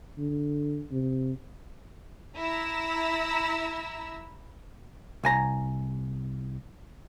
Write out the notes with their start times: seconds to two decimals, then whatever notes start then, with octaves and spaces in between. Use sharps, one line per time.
0.18 D3
0.91 C3
2.37 E4 A#5 E6
5.24 C2 G#5 A#5